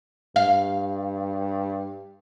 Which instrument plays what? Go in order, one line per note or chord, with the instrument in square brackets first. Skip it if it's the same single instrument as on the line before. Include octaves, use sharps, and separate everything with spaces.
[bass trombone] G2 [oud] F5